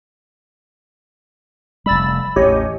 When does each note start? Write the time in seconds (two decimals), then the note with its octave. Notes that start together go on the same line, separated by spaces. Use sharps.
1.86 F1 G3 B5 E6 A6
2.36 A1 E2 G4 C#5 D#5